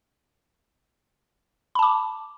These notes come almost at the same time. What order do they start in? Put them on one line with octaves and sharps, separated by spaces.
B5 A5 D6